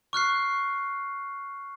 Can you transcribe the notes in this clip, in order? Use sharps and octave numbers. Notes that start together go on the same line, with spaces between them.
C#6 F6 F#6 C7